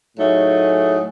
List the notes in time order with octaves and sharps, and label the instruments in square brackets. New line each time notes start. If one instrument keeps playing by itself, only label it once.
[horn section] A2 F#3 A3 D#4 G#4